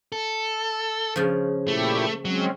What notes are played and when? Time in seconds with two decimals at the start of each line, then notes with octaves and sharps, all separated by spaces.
0.12 A4
1.16 C#3 F3
1.68 A#2 A3 E4 G4
2.25 F#3 G#3 C4 C#4